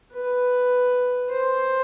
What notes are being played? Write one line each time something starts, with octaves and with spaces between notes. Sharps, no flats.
B4
C5